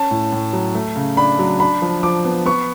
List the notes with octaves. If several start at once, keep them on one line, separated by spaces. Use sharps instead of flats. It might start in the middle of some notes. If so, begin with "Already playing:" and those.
Already playing: C#4 A5
A2
A2
F#3
A3
C#3
D4 B5
F#3
D4 B5
F3
F3 D6
B3
B3 C#6